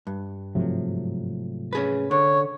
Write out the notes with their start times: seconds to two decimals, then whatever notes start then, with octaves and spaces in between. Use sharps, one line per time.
0.07 G2
0.55 G#2 C3 F3 F#3 A3
1.73 C#4 G#4 B4
2.11 D3 C#5